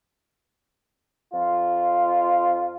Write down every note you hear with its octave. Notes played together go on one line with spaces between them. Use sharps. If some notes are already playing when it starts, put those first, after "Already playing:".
F2 F4